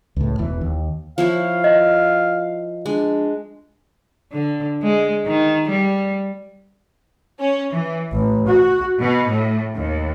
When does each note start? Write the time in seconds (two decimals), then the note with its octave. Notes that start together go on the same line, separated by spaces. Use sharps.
0.16 C#2 A2
0.39 E1 E3
0.61 D#2
1.18 F3 E4 C#5 F5
1.64 D#5
2.86 G#3 D4
4.32 D3
4.83 G#3
5.26 D#3
5.69 G3
7.39 C#4
7.72 E3
8.12 A1
8.47 F#4
8.99 B2
9.30 A2
9.75 D#2